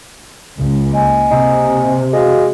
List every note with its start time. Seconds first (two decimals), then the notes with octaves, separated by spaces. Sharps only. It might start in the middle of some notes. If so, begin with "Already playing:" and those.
0.58 C#2
0.91 A#3 D#5 G#5
1.31 C3 D#4
2.13 G#3 F#4 F5